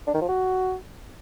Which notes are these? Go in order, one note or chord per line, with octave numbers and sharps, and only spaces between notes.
D4
D#3
F3
F#4